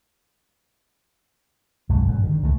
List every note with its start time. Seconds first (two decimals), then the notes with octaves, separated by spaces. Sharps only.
1.89 B1 F#2 G#3
2.06 G#1 F#2 D#3
2.23 D3 D#3
2.42 C#2 D3 F3 A3